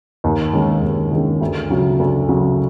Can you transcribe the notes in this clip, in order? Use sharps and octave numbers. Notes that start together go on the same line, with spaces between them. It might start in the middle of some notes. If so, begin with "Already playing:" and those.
D#2
D#3 G#3 C#4
D#2
D#3 G#3 C#4
D2
C#3 F#3
D2
C#3 F#3